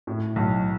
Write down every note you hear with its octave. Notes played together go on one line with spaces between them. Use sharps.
A2
B1